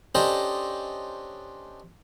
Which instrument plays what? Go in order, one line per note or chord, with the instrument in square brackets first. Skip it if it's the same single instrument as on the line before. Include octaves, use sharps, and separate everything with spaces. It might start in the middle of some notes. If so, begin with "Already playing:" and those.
[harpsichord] C#4 D4 G4 A4 C5 D#5